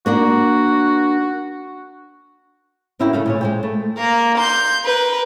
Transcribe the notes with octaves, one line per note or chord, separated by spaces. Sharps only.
A#3 D4 F#4 F#5
A#3 B3 C#4 E4 F#4 G5
C#3 A3 F5
A#2 G#4 C#5
G#3 C5 G5
A3
A#3 A#4
C6 G6
A#4 B4